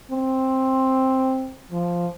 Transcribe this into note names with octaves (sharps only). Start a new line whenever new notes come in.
C4
F3